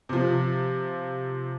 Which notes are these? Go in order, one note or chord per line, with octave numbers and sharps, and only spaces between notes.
C3 F3